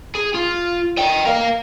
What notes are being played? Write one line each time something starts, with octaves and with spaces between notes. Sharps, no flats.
G#4
F4
D#5 G5
A#4 F5